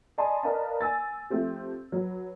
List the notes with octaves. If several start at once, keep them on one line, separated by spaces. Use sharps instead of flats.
D5 D#5 G#5 A5 B5 C6
A#4 B4 D5 D#5 F5 A5
G#5 E6 A6
F3 A3 C4 G4
F#3 B4